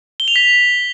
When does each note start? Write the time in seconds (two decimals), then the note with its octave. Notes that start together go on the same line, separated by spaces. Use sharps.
0.20 G7
0.28 F7
0.36 B6